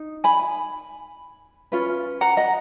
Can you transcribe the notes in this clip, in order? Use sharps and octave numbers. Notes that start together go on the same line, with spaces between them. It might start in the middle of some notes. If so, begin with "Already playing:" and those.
Already playing: D#4
G#5 B5
C#4 F4 B4
F#5 A#5
D#5 F#5